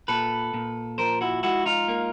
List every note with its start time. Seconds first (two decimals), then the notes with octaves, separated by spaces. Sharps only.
0.08 A#2 A4 B4
0.54 A#2
0.98 F3 A#4 C5
1.21 E4 F#4
1.43 G#3 E4 F#4
1.66 D#4 F4
1.88 A#3